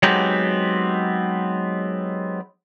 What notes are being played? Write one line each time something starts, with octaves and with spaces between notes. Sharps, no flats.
F#3 G#3 B3 C4 D#4 G4